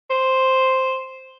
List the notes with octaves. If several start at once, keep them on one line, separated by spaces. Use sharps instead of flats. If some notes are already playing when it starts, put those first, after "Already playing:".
C5